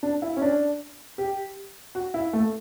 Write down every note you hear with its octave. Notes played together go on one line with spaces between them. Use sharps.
D4
E4
C#4
D4
G4
F#4
E4
A3